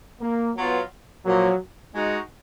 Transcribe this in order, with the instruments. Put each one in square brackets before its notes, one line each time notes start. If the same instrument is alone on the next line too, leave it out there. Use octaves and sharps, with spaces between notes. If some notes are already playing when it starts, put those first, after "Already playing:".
[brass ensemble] A#3
[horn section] F#3 B3 F4
[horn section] A#2 F3 A#3 [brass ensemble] F#3
[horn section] G#3 D#4 F#4